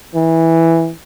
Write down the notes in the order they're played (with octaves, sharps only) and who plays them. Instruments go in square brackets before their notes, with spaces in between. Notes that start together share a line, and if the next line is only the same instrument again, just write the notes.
[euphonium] E3